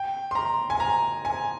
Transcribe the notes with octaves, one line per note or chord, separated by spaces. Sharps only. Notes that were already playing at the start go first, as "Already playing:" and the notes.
Already playing: G5
C6
A#5
G#5
A#5
G#5